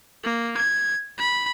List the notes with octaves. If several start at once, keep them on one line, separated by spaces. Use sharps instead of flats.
A#3
G#6
B5